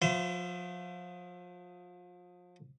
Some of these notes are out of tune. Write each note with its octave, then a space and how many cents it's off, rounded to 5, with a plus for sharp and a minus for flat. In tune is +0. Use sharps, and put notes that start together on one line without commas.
F3 +35 C5 -30 E5 +35